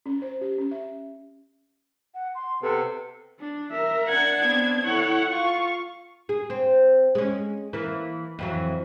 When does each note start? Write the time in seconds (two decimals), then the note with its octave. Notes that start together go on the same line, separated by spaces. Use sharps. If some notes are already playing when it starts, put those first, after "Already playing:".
0.06 C#4
0.22 C5
0.41 G4
0.58 C#4
0.71 E5
2.15 F#5
2.35 C6
2.63 C3 B3 A4 B4
3.40 D4
3.71 A#4 E5
4.09 D4 F#5 G#6
4.41 B3 C4
4.85 E4 A4 C#5 F#5
5.29 F4 F5 C#6
6.29 G#4
6.50 C4
7.15 G#3 C#4
7.73 E3 A#3
8.39 F2 E3 F#3